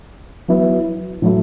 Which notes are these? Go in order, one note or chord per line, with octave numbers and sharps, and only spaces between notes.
F#3 B3 E4
A2 F#3 A3 E4